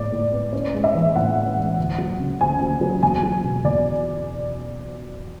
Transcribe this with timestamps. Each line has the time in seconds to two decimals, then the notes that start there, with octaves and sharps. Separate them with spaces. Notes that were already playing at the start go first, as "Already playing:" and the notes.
Already playing: A2 G#3 B3 D5
0.12 A2
0.32 B3
0.53 C#4
0.74 G#3
0.84 E5
0.95 E3
1.15 A2 F#5
1.36 C#4
1.57 G#3
1.78 D2
1.98 F#3
2.19 C#3
2.41 D2 G#5
2.61 D2
2.81 F#3
3.03 E2 G#5
3.23 F#3
3.44 B2
3.64 E2 D5